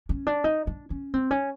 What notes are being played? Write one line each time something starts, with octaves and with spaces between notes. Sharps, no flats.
C#4
D4
D#4
D4
C#4
C4
C#4